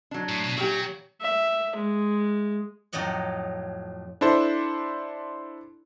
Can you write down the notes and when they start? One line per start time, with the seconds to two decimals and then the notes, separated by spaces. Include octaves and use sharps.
0.11 F#3 D4
0.29 A2
0.44 B2
0.58 A#2 F#3 G4
1.21 E5
1.76 G#3
2.93 F2 A2 F#3 D#5 F#5
4.21 D4 E4 A4 C5